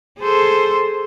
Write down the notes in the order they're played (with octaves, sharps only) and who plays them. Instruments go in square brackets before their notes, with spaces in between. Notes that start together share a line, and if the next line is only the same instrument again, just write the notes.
[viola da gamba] G#4 A4 C5